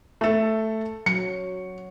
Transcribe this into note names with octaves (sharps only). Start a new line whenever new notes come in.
A3 A4
F#3 C#7